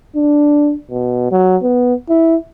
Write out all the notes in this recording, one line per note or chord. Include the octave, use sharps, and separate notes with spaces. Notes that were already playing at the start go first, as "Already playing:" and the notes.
D4
B2
F#3
B3
E4